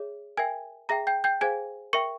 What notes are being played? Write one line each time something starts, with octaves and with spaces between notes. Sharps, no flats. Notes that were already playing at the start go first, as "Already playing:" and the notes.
Already playing: G#4 C#5 E5
A#4 E5 G5 G#5 G#6
G#4 E5 G5 A#5 A#6
G5 G6
G5 G6
G#4 C5 F5 G#5 G#6
A#4 E5 G5 C#6 C#7